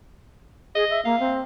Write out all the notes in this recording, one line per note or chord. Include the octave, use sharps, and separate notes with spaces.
G#4 D#5
E5
A#3 F5
C4